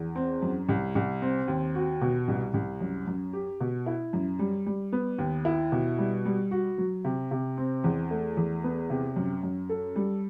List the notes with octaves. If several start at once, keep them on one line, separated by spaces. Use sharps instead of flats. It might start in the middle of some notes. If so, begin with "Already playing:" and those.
Already playing: E2
C4
F#2
C2
C2
C4
D#2
F#4
B2
C2
C2
F#2
F#2
G4
B2
E4
F#2
G3
G3
B3
D#2
E4
B2
G3
G3
F#4
F#3
C3
C3
C4
E2
A3
E2
B3
C3
F#2
F#2
A4
G3